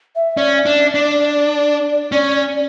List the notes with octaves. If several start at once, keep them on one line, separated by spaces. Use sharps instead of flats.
E5
C#4 D5
D4
D4
C#4